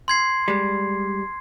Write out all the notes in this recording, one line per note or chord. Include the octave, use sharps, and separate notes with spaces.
C6 G#6 C7
G3 G#3